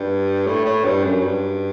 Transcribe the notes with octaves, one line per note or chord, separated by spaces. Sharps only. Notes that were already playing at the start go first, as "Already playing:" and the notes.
Already playing: G2
A2
A2
G2
F#2
G2